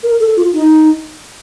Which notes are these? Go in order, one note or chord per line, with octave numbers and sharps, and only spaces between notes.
A#4
A4
F4
D#4